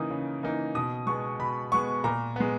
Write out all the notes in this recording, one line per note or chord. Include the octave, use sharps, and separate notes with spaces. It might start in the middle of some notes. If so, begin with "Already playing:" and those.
Already playing: C#3 E3 A#3 D#4 D#6
C#3
E3 A#3 D#4
B2 D#6
G#3 B3 C#6
B2 B5
G#3 B3 C#6
A#2 A#5
G#3 B3